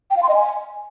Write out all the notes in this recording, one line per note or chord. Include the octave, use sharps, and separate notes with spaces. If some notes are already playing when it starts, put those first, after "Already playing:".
G5
F5
C6
D#5
G#5